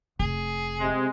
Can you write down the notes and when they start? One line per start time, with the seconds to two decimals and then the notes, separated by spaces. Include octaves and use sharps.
0.20 F1 G#4
0.79 C3 G#3